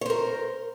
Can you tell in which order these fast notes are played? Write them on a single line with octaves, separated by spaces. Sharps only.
C#5 C5 A#4